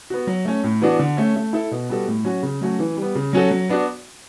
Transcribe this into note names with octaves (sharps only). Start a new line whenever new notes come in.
B3 F#4
F#3
A3 C#4
A2
E3 B3 D4 F#4
D3
A3 C#4
A3
E4 A4
B2
G3 B3 F#4 A4
A2
F#3 C#4 F#4
C#3
F#3 A3 C#4 F#4
E3
G3
B3
C#3
F#3 C#4 F#4 A4
F#3
B3 D4 F#4